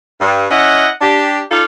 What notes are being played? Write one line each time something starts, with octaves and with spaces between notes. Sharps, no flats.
G2
C#4 E4 D#5 F#5
D4 G4
D#4 F4 A4 D5 F5